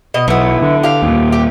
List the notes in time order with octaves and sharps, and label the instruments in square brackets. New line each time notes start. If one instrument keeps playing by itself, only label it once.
[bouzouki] B2 D#5
[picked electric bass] B1 [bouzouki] E3 B3
[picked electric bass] D3
[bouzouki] G4 F5
[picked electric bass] D#2 A#2
[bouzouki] G4